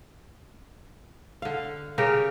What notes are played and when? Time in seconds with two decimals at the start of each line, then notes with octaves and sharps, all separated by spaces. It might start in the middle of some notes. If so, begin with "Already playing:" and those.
1.42 D3 F5
1.98 C#3 G4 A#4 C#5